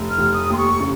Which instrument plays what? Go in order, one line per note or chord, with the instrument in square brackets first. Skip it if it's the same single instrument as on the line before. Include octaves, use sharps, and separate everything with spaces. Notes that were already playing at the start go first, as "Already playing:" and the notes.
Already playing: [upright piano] F1
[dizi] F6
[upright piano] F1
[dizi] D#6
[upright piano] D#2 [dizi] C6
[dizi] C#6
[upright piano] C#3